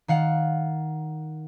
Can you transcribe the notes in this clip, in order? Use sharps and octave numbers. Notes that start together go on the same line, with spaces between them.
D#3 F5 F#5